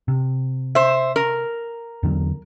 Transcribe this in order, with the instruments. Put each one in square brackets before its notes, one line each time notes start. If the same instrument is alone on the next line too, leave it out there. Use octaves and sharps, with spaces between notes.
[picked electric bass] C3
[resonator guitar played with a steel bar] C5 E5
A#4
[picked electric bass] E2 D3 F#3